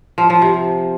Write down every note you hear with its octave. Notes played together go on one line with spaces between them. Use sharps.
F3
F3
C3